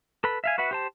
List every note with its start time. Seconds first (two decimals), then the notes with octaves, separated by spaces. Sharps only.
0.24 A4 B4 B5
0.44 E5 F5 G#5
0.58 F#4 B4 E5 F#5
0.71 G4 C5 A5